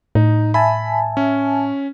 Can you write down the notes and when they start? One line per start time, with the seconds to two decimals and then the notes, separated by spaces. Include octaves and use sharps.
0.15 A2 D#4
0.54 E5 G#5 A5 B5
1.17 C#4